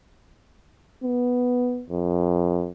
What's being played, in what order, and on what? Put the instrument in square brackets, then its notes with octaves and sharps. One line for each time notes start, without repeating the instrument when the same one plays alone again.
[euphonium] B3
F2